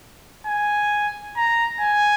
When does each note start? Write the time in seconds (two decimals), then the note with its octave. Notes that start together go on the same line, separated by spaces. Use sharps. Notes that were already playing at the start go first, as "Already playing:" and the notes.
0.47 G#5
1.37 A#5
1.81 G#5